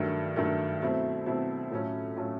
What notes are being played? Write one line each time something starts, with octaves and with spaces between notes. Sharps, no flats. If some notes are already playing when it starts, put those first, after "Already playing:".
Already playing: G2 D#3 F#3 A3
G2 D#3 F#3 A3
B2 F#3 A3 C4 E4
B2 F#3 A3 C4 E4
A2 F#3 A3 C#4 F4
A2 F#3 A3 C#4 F4